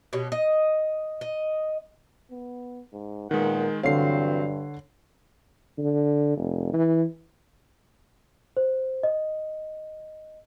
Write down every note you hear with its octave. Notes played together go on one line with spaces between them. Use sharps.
B2 C#4 G4
D#5
D#5
B3
G#2
A#2 D#3 G#3 B3 A#4 F#5
G2 D3 E3 F#3 C4 C#5 F5 C7
D3
F1
E3
C5
D#5